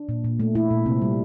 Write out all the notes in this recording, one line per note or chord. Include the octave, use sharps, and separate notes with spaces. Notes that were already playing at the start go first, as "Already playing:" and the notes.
Already playing: D4
A#2
A#2
A3
A3 E4
A#2
C3 C4
G3